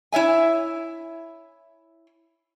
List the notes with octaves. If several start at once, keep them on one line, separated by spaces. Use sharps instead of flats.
E4 C#5 E5 G#5